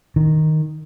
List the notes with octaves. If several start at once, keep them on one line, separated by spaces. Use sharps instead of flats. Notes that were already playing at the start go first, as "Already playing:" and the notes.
D#3